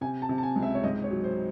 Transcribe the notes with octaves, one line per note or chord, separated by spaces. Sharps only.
C3 G#5
A5
C3
A5
G#5
C#2
E5
C#5
G#2 D#5
C#5
F#3
C5